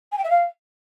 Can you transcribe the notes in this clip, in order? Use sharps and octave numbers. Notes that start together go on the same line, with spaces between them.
G#5
G5
E5
F5